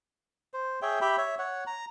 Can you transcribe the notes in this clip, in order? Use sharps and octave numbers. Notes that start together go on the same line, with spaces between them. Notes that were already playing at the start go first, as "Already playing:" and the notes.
C5
G#4 C#5 E5 G5
G4 E5 G5 B5
C#5 E5
C#5 F#5
A#5